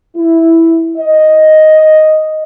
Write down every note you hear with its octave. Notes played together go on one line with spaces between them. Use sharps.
E4
D#5